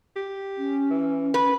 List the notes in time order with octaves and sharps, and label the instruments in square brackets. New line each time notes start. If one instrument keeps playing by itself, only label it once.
[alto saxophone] G4
[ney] C#4
[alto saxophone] E3
[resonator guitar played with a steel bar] B4